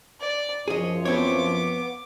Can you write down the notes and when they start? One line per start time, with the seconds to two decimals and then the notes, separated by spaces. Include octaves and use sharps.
0.20 D5
0.68 F#2 F3 G#4 C#5 D#5
1.05 B3 C4 C#5 D6